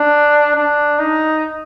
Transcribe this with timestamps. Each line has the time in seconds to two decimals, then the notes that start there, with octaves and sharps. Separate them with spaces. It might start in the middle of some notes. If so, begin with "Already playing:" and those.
Already playing: D4
0.56 D4
0.99 D#4